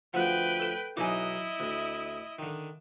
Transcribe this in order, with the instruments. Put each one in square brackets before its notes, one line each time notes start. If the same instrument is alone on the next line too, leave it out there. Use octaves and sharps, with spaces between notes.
[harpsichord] D2 F3 [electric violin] B4 G5 [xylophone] F#5 F#6
[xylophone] A4 E7 G7
[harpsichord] B1 E3 D#4 [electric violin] E4 D#5 [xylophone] G#5 D6
[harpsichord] D2
D3 D#3